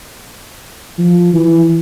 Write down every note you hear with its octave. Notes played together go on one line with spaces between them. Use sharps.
F3
E3